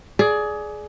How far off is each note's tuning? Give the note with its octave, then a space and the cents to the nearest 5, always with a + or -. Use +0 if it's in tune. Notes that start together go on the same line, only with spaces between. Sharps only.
G#4 +20 D5 +0